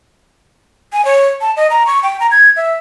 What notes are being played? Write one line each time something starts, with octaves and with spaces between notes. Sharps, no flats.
G#5
C#5
A5
D#5
A#5
C#6
G5
A#5
G#6
E5